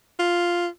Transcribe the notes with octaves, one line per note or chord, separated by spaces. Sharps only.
F4